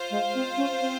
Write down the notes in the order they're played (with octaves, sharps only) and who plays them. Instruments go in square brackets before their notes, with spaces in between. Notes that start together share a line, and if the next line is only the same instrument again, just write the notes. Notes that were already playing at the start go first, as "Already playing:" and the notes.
Already playing: [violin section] F4 C5 F5
[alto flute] G#3
C4
C#4
C4